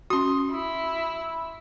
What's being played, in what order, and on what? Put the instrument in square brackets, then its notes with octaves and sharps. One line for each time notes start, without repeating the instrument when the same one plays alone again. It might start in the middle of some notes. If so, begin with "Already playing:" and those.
[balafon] C#4 F#4 [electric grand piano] C6 D#6
[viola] E4